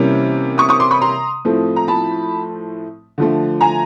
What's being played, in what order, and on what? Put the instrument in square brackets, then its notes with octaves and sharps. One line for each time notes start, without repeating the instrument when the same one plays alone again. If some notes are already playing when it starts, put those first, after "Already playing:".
Already playing: [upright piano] C3 E3 G3 A#3 C#4
C#6 D#6
C#6 D#6
C6 D6
B5 C#6
A#5 C6
A2 F3 A3 C4
A#5
A5 B5
D3 F3 A3
G#5 A#5